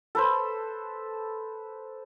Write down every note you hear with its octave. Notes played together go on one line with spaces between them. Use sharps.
A4 B4 C5